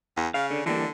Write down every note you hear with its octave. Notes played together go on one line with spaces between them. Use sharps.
E2
C#3 F5
D3
D3 E3 G3 A#3